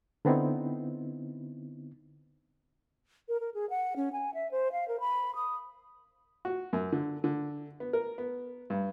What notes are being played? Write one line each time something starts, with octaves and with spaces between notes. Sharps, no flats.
D3 B3 C4 D#4 E4
A#4
A#4
G#4
F#5
C#4
G#5
E5
C5
F5
A#4
B5
D#6
F#4
F#2
D3
D3
B3
A#4
B3
G2